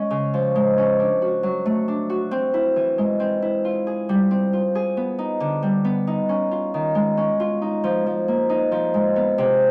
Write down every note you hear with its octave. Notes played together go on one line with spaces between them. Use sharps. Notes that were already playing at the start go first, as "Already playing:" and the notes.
Already playing: G#3 C#4
C#3
F3
G#3
C#4
D4
F#4
F#3
A3
D4
F#4
C4
E4
E3
G#3
C4
E4
F4
G#4
G3
C4
F4
G#4
B3
D#4
D3
G3
B3
D#4
C#4
F4
D#3
G#3
C#4
F4
D#4
F3
F3
A#3
D#4
F3
G#3
B3
C3